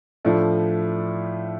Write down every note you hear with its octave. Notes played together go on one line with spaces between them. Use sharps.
A2 F3 A3 D4